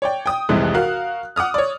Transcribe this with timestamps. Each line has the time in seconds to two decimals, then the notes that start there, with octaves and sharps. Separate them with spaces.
0.02 C#5 D5 G5
0.26 G5 D#6
0.49 F1 C2 C3 E3 G#3 F#6
0.74 F#4 A#4 F5 F#6
1.36 F#5 D6 D#6 F6
1.54 C#5 D5